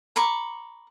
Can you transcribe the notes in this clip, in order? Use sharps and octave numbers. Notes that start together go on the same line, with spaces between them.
A#5 B5 C#6 D6